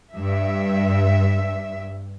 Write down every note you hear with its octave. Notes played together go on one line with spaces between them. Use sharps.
G2 E5